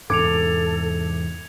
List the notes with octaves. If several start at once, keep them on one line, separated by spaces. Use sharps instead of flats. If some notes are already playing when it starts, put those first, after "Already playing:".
E2 G#2 C3 A4 D6 G#6 C#7 F7